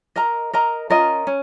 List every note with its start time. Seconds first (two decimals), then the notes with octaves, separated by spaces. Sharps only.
0.16 A#4 D#5 A#5
0.53 A#4 D#5 A#5
0.90 C#4 F4 A#4 D#5
1.27 C#4